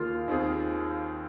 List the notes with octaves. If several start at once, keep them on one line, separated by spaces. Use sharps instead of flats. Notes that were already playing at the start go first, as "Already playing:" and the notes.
Already playing: D#2 D#3 A#3 F4 G#4
D#2 D#3 C4 G#4